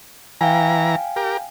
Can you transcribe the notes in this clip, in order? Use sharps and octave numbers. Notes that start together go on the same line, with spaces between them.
E3 F5 G5 G#5 A#5
G4 A#4